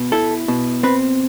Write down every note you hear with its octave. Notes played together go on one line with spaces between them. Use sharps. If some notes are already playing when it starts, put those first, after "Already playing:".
Already playing: B2
E4 A4
B2
C4 B4